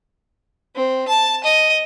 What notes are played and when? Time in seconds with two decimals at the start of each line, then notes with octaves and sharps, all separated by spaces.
0.76 C4
1.08 A5
1.44 D#5